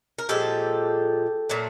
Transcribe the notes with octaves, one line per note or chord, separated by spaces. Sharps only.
A#4
A#2 F3 G#3 G4 A4
A#2 F#3 A3